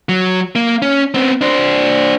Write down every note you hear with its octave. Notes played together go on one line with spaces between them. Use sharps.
F#3
A#3
C#4
B3 C4
D4 C5